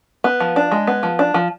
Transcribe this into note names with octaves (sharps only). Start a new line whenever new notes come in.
B3
F3
D4
G#3
B3
F3
D4
F3